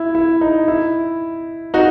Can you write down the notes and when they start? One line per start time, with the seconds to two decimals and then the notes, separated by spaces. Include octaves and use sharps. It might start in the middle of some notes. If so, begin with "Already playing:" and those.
Already playing: E4
0.15 E4
0.41 D#4
0.68 E4
1.74 D#4 F#4